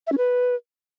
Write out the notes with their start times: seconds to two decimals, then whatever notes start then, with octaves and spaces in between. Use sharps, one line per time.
0.07 E5
0.12 C#4
0.18 B4